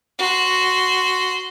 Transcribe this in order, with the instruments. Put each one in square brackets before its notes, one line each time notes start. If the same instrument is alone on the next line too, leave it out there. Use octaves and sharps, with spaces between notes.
[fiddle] F#4 C6